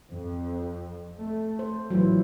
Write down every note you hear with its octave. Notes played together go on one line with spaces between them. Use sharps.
F2
A3
C5
A1 E3 F#3 F4